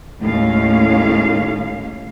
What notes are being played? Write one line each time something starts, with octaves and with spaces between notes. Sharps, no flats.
D#2 A2 G#3 C#4 F5